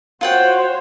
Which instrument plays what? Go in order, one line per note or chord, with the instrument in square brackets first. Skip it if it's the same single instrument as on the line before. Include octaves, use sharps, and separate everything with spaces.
[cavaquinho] F4 F#5 G5 [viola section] F#4 C5 C#5